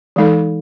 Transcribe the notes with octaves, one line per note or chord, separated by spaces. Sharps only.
E3 G#3 D#4 A4